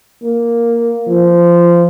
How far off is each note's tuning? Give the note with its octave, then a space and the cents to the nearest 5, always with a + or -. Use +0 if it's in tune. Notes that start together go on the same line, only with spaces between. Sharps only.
A#3 +0
F3 -20